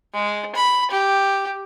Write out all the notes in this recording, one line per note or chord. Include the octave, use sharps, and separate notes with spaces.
G#3
B5
G4